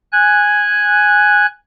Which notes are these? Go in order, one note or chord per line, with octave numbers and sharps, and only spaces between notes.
G#5 F#6